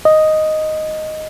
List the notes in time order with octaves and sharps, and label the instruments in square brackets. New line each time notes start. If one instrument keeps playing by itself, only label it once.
[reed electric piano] D#5